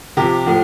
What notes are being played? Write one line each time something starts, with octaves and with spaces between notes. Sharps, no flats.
C3 F3 G4
A2 F3